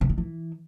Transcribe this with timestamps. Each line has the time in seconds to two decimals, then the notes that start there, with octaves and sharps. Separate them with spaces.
0.01 C3
0.09 D3
0.18 E3